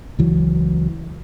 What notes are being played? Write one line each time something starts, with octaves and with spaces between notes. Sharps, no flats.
C#2 E3 F#3